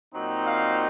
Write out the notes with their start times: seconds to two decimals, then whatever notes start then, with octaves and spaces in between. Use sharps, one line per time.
0.13 A#2 F#3 C4 D#4
0.47 F5